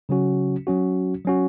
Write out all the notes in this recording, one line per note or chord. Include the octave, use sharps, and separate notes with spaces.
C#3 F#3 C#4 F#4
F#3 C#4 F#4
F#3 C#4 F#4